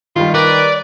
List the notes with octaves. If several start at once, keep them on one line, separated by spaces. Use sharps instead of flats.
D#3 G3 F4
A#4 B4 D5